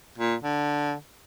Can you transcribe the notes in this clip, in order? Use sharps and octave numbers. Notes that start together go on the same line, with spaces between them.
A#2
D3